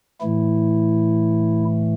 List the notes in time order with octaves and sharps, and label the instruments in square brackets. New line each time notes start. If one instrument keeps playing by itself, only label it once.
[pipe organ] A2 E3 A3 E4